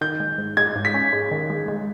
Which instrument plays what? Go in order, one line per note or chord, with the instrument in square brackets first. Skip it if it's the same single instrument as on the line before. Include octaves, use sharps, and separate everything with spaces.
[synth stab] D#3 [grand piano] G6
[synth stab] G#3
G#2
[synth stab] G#3 [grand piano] G#6
[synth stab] G#2
[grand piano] B6
[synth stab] C#4
G#3
D#3
G#3
G#3